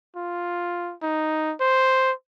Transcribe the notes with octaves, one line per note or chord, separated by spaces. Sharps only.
F4
D#4
C5